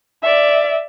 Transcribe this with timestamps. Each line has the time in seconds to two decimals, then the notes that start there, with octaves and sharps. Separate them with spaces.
0.22 D5 E5